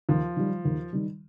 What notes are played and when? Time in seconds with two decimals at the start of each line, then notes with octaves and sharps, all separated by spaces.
0.09 D#2 F3
0.37 D#3 G3
0.65 D#2
0.93 D#3 G3